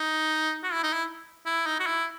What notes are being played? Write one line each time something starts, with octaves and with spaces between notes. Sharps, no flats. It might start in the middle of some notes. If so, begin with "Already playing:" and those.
Already playing: D#4
F#4
E4
D#4
E4
E4
D#4
F#4
E4